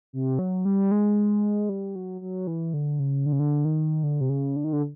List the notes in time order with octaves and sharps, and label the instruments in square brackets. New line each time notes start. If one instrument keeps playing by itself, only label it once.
[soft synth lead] C3
F#3
G3
G#3
G3
F#3
F#3
E3
D3
C#3
D3
C#3
D3
D#3
D3
C3
C#3
D3
D#3
D3